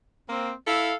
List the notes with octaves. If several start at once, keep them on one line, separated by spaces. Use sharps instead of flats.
A#3 C4
E4 A4 F5